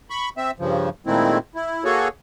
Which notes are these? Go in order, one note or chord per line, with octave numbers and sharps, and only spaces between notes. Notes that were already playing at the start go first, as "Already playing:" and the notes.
B5 C#6
C4 E5
G2 C#3 F3
A#2 D#3 G#3 A3 C4 E4
E4
A#3 F#4 G#4 A4 C#5